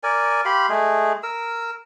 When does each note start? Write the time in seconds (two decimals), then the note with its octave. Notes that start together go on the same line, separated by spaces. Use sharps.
0.03 A#4 D5 G#5
0.45 G4 F5 B5 C6
0.69 G#3 A3 G#4
1.23 A#4 E6